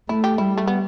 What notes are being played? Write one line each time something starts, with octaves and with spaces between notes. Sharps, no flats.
A3 E4
G4
G3 E4
A3
B3